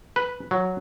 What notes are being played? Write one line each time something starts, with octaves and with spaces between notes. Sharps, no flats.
B4
F#3